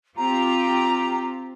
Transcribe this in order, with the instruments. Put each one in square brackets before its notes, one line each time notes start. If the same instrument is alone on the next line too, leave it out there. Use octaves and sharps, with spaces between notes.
[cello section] C4 F4 G4 [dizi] A#5